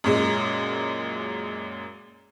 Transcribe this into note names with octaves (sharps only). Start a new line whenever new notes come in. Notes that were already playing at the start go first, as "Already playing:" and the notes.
F#2 A#2 G#3